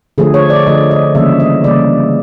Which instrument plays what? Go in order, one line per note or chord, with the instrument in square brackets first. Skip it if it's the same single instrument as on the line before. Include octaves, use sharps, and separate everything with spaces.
[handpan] D3 F3 A3 G#4
C#5
D5
D3 F3 A3 D#5
D#5
C#3 E3 G3 A#3 E5
D#5
C#3 E3 G3 A#3 D5